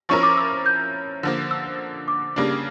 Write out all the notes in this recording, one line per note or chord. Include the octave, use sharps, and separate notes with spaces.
F3 C#4 E4 A#4 C#6
D6
E6
G6
D3 F3 A#3
E6
D6
C#3 G3 A#3 D4